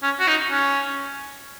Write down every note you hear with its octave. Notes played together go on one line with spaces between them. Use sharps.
C#4
F#4
D#4
C#4